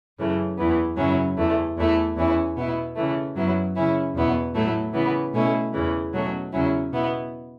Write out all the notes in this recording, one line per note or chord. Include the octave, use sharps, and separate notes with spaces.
F#2 C#3 E3 A3
E2 E3 B3
F#2 C#3 F#3 C#4 E4
E2 E3 A3
E2 E3 A3 E4
E2 E3 C#4 E4
B2 B3 E4
C#3 E3 A3
F#2 F#3 B3 E4
C#3 E3 C#4 E4
E2 B2 B3 E4
A2 F#3 A3 E4
C#3 E3 B3
B2 A3 C#4 E4
E2 C#3 E3
B2 F#3 A3 C#4
E2 C#3 F#3 C#4 E4
B2 B3 E4